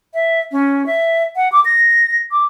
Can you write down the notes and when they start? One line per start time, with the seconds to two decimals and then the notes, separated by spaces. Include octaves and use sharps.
0.14 E5
0.52 C#4
0.86 E5
1.36 F#5
1.52 D6
1.65 A#6
2.31 D6